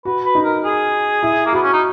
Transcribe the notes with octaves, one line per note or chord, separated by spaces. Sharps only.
F#4 B4
B4
D#4
A#4
G#4
E4
A#3
B3 F#4
C#4
D#4